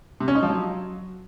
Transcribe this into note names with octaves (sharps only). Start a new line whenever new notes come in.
C3
C#4
D#4
F3
F#3